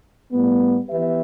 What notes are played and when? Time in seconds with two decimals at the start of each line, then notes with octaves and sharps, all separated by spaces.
0.32 A2 G3 B3
0.89 E3 B3 G4 B4 E5